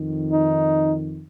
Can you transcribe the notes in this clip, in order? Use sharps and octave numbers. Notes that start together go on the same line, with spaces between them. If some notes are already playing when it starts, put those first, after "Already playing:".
Already playing: F2 D#3
D#4